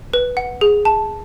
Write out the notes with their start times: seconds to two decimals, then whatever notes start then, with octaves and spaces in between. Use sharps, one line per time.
0.14 B4
0.37 F#5
0.61 G#4
0.85 A5